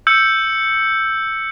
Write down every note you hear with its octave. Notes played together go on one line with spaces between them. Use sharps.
E6 G6 C#7